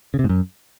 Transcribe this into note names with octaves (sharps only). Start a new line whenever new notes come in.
C#3
C3
G#2
F#2